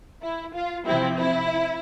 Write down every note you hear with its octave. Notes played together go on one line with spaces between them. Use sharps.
E4
F4
C3 F3 C4 E4
E4